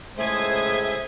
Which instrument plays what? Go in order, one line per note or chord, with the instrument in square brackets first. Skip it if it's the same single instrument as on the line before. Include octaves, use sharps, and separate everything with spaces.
[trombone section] C#2 A2 G#3 [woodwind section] A3 E5 [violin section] C5 D#6 G#6